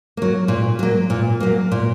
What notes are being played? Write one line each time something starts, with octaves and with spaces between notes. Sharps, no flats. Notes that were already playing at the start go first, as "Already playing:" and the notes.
F#3 A#3
A#2
F#3 A#3
A#2
F#3 A#3
A#2